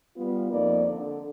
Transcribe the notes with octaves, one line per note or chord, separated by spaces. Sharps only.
G3 B3 F4
F2 A#3 D#4 D5
D3